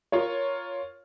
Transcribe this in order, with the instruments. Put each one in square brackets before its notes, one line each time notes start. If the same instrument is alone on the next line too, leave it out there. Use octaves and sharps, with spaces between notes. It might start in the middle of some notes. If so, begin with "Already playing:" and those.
[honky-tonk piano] F4 A#4 C#5